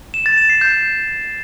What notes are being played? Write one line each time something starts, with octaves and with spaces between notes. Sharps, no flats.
E7
A6
E7
C7
G6